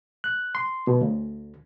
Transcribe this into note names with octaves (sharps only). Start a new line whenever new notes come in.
F#6
C6
B2
D2